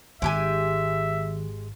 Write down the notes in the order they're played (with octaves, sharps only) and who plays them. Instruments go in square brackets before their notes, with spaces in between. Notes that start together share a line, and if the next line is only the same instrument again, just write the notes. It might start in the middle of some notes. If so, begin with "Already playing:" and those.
[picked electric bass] G#1 [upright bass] D#3 [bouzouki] G#3 G4 G#5 [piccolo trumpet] E5